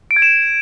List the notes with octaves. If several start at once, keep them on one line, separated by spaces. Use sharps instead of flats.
D7
G#6
E7